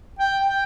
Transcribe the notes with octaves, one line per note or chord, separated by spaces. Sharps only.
G5
G5